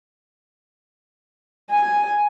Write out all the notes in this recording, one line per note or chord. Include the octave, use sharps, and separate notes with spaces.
G#5